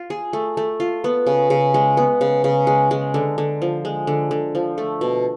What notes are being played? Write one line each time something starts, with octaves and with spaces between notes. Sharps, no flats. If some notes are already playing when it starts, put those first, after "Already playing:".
Already playing: F4
G#4
A3
A3
F4
B3
C#3
C#3
G#3
B3
C#3
C#3
G#3
G#3
D3
D3
F3
G#3
D3
D3
F3
A3
B2